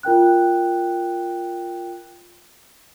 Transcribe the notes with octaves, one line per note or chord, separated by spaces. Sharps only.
F4 A#4 G5 F#6